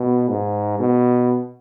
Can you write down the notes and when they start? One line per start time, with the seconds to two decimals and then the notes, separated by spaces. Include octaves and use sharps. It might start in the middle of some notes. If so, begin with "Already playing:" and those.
Already playing: B2
0.29 G#2
0.79 B2